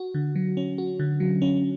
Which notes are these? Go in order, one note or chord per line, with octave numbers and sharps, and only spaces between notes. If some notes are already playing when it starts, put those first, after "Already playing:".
Already playing: F#4
D3
F#3
C#4
F#4
D3
F#3
C#4